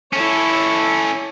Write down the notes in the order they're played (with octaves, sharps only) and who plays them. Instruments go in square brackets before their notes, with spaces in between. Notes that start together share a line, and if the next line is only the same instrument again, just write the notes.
[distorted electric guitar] C#4 A4 [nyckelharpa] E4 C#5